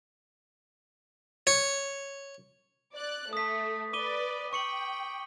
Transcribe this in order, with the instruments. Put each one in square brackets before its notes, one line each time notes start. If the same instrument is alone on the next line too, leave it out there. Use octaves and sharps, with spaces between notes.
[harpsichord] C#5
[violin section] D5 F#6
[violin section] A3 [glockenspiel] D#6 B6
[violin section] B4 D5 [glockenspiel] D6 D#7 G7
[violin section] G5 [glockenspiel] C#6 C#7 F#7